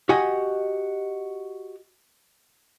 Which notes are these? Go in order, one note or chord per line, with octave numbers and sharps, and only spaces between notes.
F#4 G4 D#5 G#5